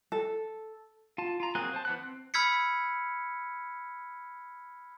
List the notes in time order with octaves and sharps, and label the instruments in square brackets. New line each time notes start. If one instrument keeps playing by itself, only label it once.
[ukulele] A4
[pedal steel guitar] F4 A5
F4 A#5
F#3 A#3 C4 G#4 F#6
C5 A5
E3 B3 F#6
C4
[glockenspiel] B5 E6 F6 G#6 B6 C#7